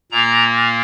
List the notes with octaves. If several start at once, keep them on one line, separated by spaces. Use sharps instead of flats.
A#2 A#3 A#5